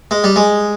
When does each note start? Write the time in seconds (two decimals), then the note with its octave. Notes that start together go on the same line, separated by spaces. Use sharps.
0.11 G#3
0.24 G3
0.36 G#3